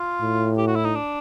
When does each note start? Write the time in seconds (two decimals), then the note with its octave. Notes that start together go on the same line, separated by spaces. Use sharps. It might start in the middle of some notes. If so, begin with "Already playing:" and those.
Already playing: F4
0.21 A2
0.58 G4
0.67 F#4
0.76 E4
0.85 D#4
0.95 D4